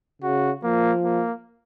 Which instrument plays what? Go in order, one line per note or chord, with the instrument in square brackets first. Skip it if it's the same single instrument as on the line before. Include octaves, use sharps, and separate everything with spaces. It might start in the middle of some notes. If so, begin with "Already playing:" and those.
[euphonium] C#3 [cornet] F#4
[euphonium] F3 [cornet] A#3
[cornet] A#3